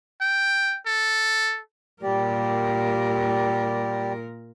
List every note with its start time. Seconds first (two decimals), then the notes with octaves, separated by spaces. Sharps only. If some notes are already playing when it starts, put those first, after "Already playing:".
0.21 G5
0.86 A4
2.03 A#2 G3 G4 A#4 D5